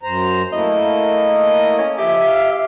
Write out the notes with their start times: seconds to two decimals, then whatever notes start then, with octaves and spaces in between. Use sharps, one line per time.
0.03 F#2 C5 A#5
0.53 A3 A#3 E4 D#5
1.79 C#4
1.98 F3 G4 E5
2.24 F5